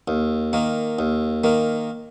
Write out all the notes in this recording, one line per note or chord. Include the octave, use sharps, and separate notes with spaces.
D#2
D#3 A#3
D#2
D#3 A#3